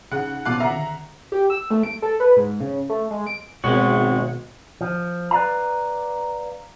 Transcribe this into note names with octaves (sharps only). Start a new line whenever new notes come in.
C#3 C#4 D#4 F#5
B2 F4 F5 D6 F#6
D3 D#3 E5 F#5 A#5 C7
G4
E6
A3
D7
A4
B4
G#2
C#3
A3
G#3
D7
G#1 B2 G#3 C4 F#4 C#5
F3
B4 D5 E5 F5 A#5